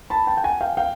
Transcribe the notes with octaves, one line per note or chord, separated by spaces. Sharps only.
A5 B5
G5 A5
G5
F#5 G#5
F5 G5
F5 G5